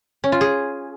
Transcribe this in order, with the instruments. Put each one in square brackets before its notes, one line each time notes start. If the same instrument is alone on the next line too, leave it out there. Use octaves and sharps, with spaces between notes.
[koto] C#4
F4
G#4